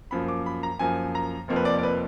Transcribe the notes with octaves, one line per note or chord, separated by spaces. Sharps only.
F#2 F3 A#3 B5
D6
B5
A#5
F#2 F3 A#3 G#5
A#5
F1 F2 F3 A#3
B4
D5
D5
B4